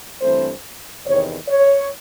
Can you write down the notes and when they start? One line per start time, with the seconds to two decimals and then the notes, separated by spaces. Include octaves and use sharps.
0.21 G2 E3 A3 C4 C5
1.06 E2 C3 D#3 C#5
1.48 C#5